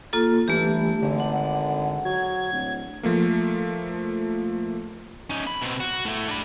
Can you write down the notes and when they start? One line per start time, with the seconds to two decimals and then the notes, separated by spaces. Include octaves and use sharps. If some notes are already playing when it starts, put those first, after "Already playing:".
0.13 A#3 F4 A4
0.48 G1 E3 A3 G4
1.02 G#1 D3
1.20 F#5
2.05 F#3 G#6
2.52 D1
3.03 F3 A3 A#3
5.30 C#4 D#4
5.47 B5
5.62 B2 C4
5.80 F#4
6.05 A2 A3
6.29 D4 B5